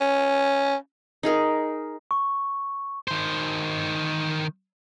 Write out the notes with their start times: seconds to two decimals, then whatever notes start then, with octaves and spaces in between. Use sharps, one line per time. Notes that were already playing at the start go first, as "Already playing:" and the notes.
0.01 C#4
1.23 D#4 G#4 A#4
2.11 C#6
3.08 D#3 C5